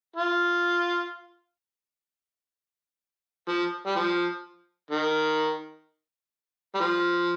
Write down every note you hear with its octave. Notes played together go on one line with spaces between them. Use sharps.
F4
F3
G3
F3
D#3
G3
F3